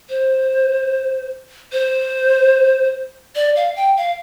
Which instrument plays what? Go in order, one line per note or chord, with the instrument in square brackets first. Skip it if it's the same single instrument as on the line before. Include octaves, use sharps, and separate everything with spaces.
[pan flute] C5
C5
D5
F5
G5
F5